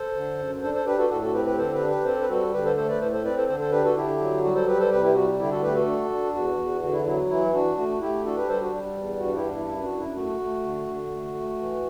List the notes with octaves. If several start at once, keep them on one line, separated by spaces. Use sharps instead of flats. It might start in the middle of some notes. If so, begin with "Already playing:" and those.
Already playing: A4 C5
D3
F#2
D4 A4 C5
A4 C5
D4 G4 B4
F#4 A4
A2 F#4 A4
F#4 A4
C4 G4 B4
G4 B4
D3 A4 C5
G4 B4
D4
G4 B4
C4 A4 C5
B4
G3 F#4 A4
D3 G4 B4
A4 C5
A3 A4 C5
B4 D5
A2 A4 C5
A4 C5
C4 B4 D5
A4 C5
D3 A4 C5
A4 C5
D4 G4 B4
F#4 A4
D3 E4 G4
F#3
G3 F#4
A4 C5
G3 G4 B4
A4 C5
C3 G4 B4
E4 G4
G3 F#4
D3 E4 G4
F#4 A4
A3 G4 B4
F#4 A4
D4
D4
E2 F#4
E2
D3 F#4
E4
F#3 E4
E3 E4
D4 F#4
A3 F#4
A3 E4 G4
D4 F#4 A4
G4 B4
G3 A4 C5
F#4
G3
E2
G2 F#4
E4 G4
D4
E4
F#2 E4
F#4
F#2
E4
A3 F#4
A3
D3
D3
A3
A3
E3